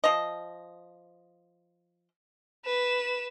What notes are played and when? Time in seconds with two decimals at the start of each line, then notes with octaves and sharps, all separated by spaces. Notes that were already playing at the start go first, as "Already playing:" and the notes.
0.04 F3 D#5
2.65 B4 E7